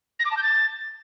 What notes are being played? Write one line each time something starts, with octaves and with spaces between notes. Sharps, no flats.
A#6
D6
A5
G6
A6